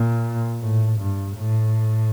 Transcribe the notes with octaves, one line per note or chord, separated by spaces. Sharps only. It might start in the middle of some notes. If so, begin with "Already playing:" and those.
Already playing: A#2
A2
G2
A2